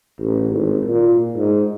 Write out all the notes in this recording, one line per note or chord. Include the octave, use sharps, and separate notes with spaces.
A1
G#1
A#2
G#2